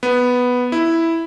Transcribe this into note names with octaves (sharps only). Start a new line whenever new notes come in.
B3
E4